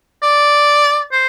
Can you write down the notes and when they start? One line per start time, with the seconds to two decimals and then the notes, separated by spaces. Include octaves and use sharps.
0.22 D5
1.12 C5